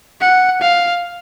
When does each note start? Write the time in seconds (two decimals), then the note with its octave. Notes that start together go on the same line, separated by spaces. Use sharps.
0.21 F#5
0.61 F5